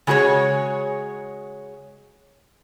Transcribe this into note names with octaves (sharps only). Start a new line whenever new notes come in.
C#3 G#3 F#4 G#4 C#5